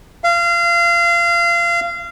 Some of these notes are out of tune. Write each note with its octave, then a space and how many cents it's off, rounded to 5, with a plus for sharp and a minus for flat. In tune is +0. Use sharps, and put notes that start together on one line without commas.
F5 -25